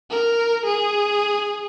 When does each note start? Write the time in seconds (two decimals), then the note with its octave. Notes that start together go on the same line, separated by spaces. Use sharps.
0.10 A#4
0.65 G#4